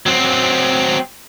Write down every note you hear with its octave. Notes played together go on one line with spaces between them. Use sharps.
F#3 C4